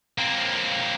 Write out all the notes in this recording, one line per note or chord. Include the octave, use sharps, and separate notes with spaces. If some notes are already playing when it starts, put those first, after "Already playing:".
A#3 C4